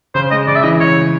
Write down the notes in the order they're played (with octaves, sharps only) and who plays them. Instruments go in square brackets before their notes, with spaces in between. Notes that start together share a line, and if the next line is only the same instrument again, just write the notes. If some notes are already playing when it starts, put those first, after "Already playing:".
[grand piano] C#3 [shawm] C5
[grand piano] G#3 [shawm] D#5
[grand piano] C#3 [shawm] D5
[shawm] E5
[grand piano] E3 [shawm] D#5
[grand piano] C#3 [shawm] C#5
[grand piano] C#3